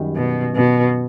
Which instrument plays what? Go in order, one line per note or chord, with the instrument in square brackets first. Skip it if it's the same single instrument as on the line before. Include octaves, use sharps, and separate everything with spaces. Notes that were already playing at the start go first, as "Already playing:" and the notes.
Already playing: [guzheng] F#2 D#3 G3
[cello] B2
B2